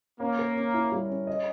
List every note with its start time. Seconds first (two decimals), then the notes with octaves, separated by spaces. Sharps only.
0.20 A#3 C#4
0.39 A#4
0.57 C#4
0.74 E4
0.92 G3
1.09 C#4
1.27 D#5